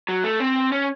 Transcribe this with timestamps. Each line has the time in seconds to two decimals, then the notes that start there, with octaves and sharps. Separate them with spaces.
0.09 F#3
0.24 A3
0.40 C4
0.72 C#4